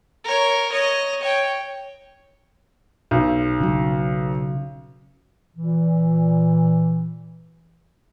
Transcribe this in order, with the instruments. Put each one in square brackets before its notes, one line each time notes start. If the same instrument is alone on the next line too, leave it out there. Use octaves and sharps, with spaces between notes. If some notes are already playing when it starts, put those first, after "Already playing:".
[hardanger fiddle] A#4 C#5
C#5 D#5
C#5 G5
[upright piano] B1
[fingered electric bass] C#3 F#3
[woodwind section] A#2 E3